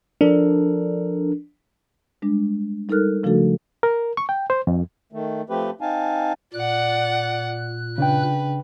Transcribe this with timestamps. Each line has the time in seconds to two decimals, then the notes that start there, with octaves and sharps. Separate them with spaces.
0.21 F3 D4 A4 A#4
2.22 G3 G#3 D4
2.89 G3 D#4 A4 A#4 F6 F#6
3.23 C#3 F3 A3 D4 F#4 A4
3.83 A#4
4.17 C#6
4.29 G5
4.50 C5
4.67 F2
5.13 D#3 A3
5.50 F3 A3 C4 G4 B4
5.81 C4 D#4 F5 G#5 A5
6.54 A#2 D5 F#5 F#6
7.98 C#3 D4 B4 G5